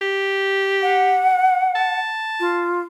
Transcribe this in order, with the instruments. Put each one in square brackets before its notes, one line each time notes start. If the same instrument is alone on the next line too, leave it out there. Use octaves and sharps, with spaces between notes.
[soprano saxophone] G4
[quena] F#5
[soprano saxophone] A5
[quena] F4